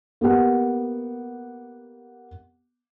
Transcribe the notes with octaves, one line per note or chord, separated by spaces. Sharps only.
A#3 B3 G4 F#5